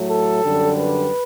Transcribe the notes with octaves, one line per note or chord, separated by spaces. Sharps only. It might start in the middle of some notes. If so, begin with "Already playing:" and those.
Already playing: A2 F#3 A3
A4
F#2 D3 G3
B4